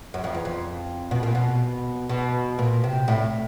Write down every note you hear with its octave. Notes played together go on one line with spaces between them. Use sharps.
F#2
F2
E2
F2
B2
A#2
B2
B2
A#2
C3
A2